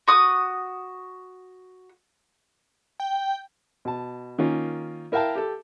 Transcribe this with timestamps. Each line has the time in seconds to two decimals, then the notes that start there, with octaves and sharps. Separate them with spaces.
0.08 F#4 D#6
3.00 G5
3.85 B2 A5
4.38 D#3 A#3 C#4 F4
5.12 E4 A#4 E5 F5 G5 A5
5.35 G4 A4